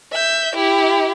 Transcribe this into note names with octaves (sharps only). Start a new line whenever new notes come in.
E5 G6
E4 G4